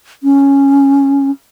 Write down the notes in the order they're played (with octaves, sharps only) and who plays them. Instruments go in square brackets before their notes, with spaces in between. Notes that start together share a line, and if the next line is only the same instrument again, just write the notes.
[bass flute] C#4